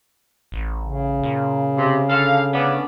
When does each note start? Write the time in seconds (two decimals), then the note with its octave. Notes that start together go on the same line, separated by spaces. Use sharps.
0.52 A1
0.84 C#3
1.23 A#2
1.78 C3
2.09 D3 A4 F5
2.53 D3 B3 C#4 D4